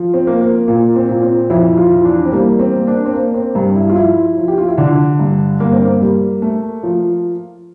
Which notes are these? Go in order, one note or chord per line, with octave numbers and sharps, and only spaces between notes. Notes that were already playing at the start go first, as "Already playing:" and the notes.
Already playing: F3
C4
A#3
A#3
A#2 A#3
C4
A#2
C4
F2 E4
F4
E3
D4
C4
G3 A#3
C4
A#3
D4
C4
A#3
C4
G2 G4
E4
F4
F3 E4
F3
G4
F4
E4
D3 D4
G2
G2 A#3
C4
A#3
G3
A3
F3